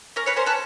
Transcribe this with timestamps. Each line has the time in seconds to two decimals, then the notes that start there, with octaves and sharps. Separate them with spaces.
0.16 C#4 A#4
0.26 B4 C#5
0.36 C#4 A#4 C5
0.46 A4 B4